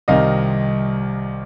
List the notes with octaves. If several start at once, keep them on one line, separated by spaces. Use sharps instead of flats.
C2 C3 D#3 D#5 F5